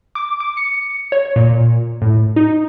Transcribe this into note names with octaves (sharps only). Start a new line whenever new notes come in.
D6
D6
C#7
C#5
A#2
A2
D#4